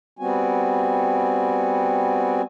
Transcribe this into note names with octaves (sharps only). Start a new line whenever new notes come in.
G3 B3 C4 F#4 G#5